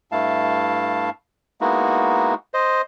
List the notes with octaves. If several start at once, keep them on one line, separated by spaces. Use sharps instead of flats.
G2 A3 E4 F5 A5
G#3 A#3 B3 D#4 E4 F#4
C5 D#5